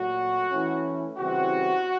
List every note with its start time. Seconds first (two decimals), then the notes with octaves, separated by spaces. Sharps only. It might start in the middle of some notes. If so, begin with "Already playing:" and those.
Already playing: A#2 F#3 A3 F#4
0.51 E3 A3 C#4 E4
1.18 C#3 E3 G3 C4 E4 F#4